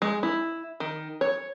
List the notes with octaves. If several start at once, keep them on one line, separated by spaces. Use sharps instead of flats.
G#3
E4
D#3
C#5